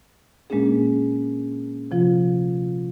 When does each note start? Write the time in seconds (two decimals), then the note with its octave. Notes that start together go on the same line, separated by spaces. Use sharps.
0.50 A#2 G#3 A#3 C#4 D4 G#4
1.91 C3 F3 F4